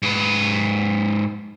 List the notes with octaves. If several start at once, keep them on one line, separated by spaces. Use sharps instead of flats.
G#2 B4